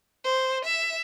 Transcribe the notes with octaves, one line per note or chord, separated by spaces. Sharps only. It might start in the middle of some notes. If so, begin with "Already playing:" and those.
C5
E5